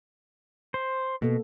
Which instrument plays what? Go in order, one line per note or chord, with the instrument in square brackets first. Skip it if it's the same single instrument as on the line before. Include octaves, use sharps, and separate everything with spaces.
[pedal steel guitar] C5
[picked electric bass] B2 [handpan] A#3 B3 A4